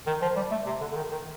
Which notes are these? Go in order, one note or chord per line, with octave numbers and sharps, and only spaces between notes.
D#3
F3
G3
A3
C3
D3
D3
D#3
D#3